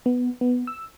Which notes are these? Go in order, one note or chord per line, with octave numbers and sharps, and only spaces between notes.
B3
B3
E6